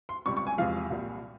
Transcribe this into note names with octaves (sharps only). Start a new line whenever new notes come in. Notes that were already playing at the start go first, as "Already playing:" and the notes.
C6
C#2 C3 G3 C#6
C#6
G#5
E2 C3 F3 G#3 F5
C2 A#2 G3